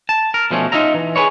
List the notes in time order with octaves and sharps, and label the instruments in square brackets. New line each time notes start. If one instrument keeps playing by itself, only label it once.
[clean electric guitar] A5
A#4
B2 F3 A3 C#4
D#4 F4 E5 A#5
E3
G#4 A#4 B4 C#5